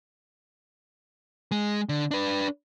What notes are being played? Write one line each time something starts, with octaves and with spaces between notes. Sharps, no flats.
G#3
D3
D4 B4